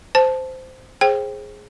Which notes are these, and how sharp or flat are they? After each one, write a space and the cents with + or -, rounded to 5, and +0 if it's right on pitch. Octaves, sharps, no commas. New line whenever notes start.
C5 -15 A5 -10
G#4 +0 C5 +30 G5 +0